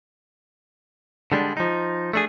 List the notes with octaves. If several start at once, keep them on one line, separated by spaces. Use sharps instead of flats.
D3 G3 G#3 D4
F3 D#4
A3 D4 G#4